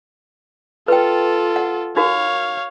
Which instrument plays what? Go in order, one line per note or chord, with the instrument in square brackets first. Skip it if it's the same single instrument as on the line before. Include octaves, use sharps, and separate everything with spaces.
[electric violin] F4 A4 [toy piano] B4 G5
[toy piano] F#5
[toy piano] D#4 F#4 A#4 [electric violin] C#5 F5